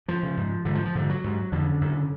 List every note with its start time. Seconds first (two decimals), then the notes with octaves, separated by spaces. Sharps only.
0.08 F#2 F3
0.23 C#3
0.37 G#2
0.65 G#2 D3
0.75 F3
0.85 F3
0.95 G#2 D3
1.09 F#3
1.24 G#2
1.52 F2 D3
1.67 C#3
1.81 F#2
1.95 C#3